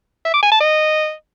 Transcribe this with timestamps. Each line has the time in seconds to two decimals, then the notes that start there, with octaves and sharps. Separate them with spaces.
0.25 E5
0.34 D6
0.43 G#5
0.52 A5
0.60 D#5